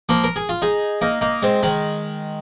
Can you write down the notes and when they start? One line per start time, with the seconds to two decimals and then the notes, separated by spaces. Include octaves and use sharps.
0.09 F3 A#3
0.24 A#4
0.36 G#4
0.49 F4
0.62 D#4 G#4
1.01 A#3 D#4
1.21 A#3 D#4
1.42 G#3 C4
1.63 D#3 G#3